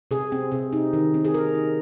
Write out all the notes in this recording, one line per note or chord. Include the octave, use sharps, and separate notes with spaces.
C3 G#4
C4
C3
D#4
D#3
C4
G#4
D#3 A#4
D#4